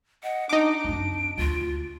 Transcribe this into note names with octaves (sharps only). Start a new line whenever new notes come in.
D#5 F#5
D4 D#4 D6 D7
F#2 C4
D2 F4